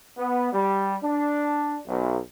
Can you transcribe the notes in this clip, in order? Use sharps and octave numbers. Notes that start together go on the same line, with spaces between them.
B3
G3
D4
B1